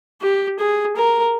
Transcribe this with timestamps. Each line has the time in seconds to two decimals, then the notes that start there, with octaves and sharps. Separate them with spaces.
0.22 G4
0.59 G#4
0.97 A#4